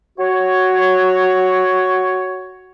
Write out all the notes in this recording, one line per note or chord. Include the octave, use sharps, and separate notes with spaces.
F#4 C#5